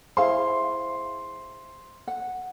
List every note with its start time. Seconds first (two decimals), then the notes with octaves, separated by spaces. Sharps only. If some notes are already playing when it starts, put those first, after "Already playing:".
0.17 E4 G#4 C5 E5 F5 C6
2.08 F#5